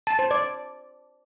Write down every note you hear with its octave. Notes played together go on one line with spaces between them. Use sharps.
A5
C5
D5